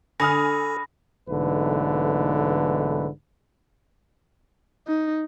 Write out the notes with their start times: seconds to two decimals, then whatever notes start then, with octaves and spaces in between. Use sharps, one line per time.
0.20 D3 A4 G#5 B5 D#6 F6 A#6
1.29 B1 G#2 D3 E3 A3 B4
4.87 D#4